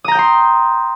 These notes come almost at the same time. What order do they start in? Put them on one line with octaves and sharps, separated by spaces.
D#6 A#5 G6 G5 C6